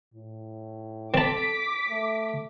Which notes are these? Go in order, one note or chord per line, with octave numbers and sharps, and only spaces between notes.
A2
C4 A4 A5 D6 B6
A3